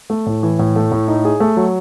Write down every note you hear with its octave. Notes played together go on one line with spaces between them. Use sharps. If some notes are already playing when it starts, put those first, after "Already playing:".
A3
A2
E3
A2
A3
A2
D#4
G#4
A3
F#3